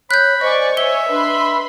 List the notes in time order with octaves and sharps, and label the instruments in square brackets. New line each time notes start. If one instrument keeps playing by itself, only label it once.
[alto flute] C#5 [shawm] B5 [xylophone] F#6 G6
[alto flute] C5 [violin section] D5 G#5 C#6 [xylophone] D#5
[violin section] C#5 G#5 [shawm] E5 [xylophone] G7
[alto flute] D4 [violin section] B4 B5 C6